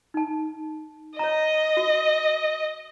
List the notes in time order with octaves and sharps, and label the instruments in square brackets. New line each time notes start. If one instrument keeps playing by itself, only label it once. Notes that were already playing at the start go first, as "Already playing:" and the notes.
[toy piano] D#4 A5
[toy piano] C#5 A#5 [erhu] D#5
[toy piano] F#4